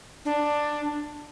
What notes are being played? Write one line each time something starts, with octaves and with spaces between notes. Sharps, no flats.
D4